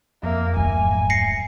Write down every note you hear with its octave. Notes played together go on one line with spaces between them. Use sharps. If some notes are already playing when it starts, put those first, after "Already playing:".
F2 A#3 E5
D1 G#2 G#5
A#6 C7 C#7